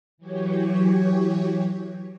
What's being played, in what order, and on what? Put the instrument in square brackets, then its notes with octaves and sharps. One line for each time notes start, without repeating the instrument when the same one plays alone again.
[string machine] E3 F#3 G4 C#5